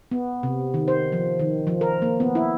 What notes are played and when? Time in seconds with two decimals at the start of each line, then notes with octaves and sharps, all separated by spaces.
0.11 B3
0.43 C3
0.74 D#3
0.88 C5
1.12 F3
1.39 D#3
1.67 F3
1.81 A#4
2.02 A#3
2.20 B3
2.35 E4